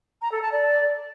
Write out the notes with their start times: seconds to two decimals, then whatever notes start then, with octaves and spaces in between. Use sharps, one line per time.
0.22 A#5
0.32 A4
0.42 A5
0.52 D5